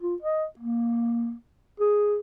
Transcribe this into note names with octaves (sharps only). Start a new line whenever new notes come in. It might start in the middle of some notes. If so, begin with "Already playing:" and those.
F4
D#5
A#3
G#4